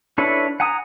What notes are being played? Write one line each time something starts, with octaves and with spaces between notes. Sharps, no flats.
D4 E4 A4 B4 C#5
F#5 G#5 A#5 D#6